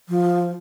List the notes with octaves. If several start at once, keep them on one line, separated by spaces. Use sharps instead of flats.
F3